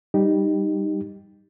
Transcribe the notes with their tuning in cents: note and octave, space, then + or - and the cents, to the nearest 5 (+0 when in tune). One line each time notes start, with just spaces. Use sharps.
G3 +0 D#4 -10 G4 +0